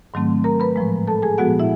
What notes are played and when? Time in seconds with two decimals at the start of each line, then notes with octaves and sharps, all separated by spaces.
0.14 G#2 D#3 F#3 A3 C4
0.44 A#4 A#5
0.60 B4 B5
0.76 A2 F3 G#3
1.07 A4 A5
1.22 G#4 G#5
1.38 A#2 F3 G#3 B3 F#4 F#5
1.60 E4 E5